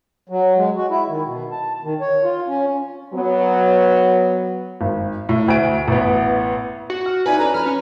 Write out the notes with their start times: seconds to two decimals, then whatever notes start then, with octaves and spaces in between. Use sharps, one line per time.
0.29 F#3
0.57 G#3
0.77 F#4
0.90 E4
1.09 D#3
1.25 B2
1.51 A5
1.84 D#3
2.01 C#5
2.24 F4
2.48 C#4
3.14 F#3 B3
4.81 G#1
5.29 A2
5.48 D2 D7
5.88 A1 B3
6.90 F#4
7.06 F6
7.26 D#4 E4 B4 D5 G#5
7.38 C#4 A4 D5 A#5
7.54 F3 B4 F6
7.66 C#4